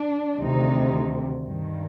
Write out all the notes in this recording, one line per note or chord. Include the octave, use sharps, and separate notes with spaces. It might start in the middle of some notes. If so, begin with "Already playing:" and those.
Already playing: D4
D2 C3 D#3 D#4
G2 D#3